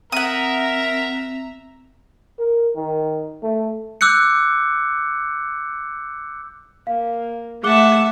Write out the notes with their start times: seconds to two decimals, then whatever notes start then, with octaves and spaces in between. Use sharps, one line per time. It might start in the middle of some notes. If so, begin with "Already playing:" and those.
0.12 C4 A#4 E5 F#5 A#5 D#6
2.39 A#4
2.76 D#3
3.43 A3
4.01 D6 E6 F#6 G6 C#7
6.87 A#3 F5
7.63 A3 G#4 E5 F#5 A5 D6 G7